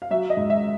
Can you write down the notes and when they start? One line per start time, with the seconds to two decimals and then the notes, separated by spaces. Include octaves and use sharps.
0.02 F5
0.10 F#3 E5
0.30 D#5
0.37 G#2
0.50 E5